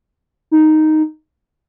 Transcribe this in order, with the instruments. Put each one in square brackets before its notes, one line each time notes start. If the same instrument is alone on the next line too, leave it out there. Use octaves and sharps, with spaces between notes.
[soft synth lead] D#4